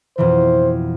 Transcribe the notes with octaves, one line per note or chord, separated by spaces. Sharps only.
F2 B2 E3 C5